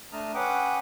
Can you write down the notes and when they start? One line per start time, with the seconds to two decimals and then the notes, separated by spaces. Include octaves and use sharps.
0.12 A3 D4 A5 A#5 D#6 F6
0.35 C#4 B4 F#5 G5 D6 D#6